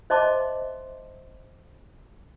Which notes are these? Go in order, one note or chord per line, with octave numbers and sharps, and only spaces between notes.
C5 D#5 E5 A5 C6 D6